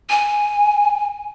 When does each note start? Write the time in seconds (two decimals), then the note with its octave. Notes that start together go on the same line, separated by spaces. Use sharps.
0.10 G#5